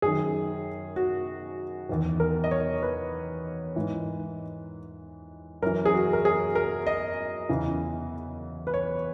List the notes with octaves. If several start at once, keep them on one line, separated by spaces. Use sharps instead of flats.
F#2 D#3 G#4
F#4
E2 D#3
A#4
D#5
C#5
B4
G#2 E3
F#2 E3 A#4
G#4
F#4
A#4
G#4
A#4
D#5
E2 C#3 E3
B4
C#5